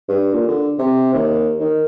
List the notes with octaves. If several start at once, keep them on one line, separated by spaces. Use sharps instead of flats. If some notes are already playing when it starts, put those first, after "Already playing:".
G2
A#2
D3
C3
D#2
D#3